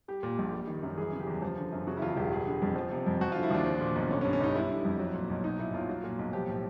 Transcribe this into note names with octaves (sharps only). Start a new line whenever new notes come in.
G3 G4
A#2
A#1
G3
D#3
F#2
E3 G#4
C#3
G4
E2
F3
D3
F#2
C#3 F#4
E4
E2 F4
E1 G4
G3 G#4
D3
F2
F3
C3
F2
F3 F#4
F4
D3
E4
D#2 D4
F3
A#2
B1
D3 C#4
C#4
G2
C#4
G1 D#4
G3 E4
D3
F2
F#3
A#2
B1
F#3 D#4
A#2 E4
B1 F4
F#3
A#2
B1
F3 G4
A2